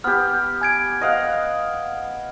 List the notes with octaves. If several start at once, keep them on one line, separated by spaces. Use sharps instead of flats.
B3 G4 F6
G#5 G#6 D7
D#5 F5 F#5